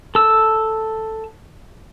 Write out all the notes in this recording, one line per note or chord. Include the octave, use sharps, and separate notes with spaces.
A4 E6